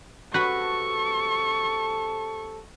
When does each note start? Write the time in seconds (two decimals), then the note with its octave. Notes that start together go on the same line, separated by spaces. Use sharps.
0.34 C3 F#4 A4 B4 C#6